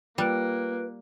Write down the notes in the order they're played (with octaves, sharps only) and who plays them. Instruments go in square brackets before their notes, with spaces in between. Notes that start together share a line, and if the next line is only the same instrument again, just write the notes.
[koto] G3 [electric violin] A#3 [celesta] F4 F#6 D7 [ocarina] B4